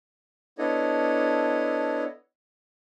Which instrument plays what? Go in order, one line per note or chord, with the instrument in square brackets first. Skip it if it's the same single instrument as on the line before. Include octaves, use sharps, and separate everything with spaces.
[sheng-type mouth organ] B3 D4 E4 A4 C#5 D#5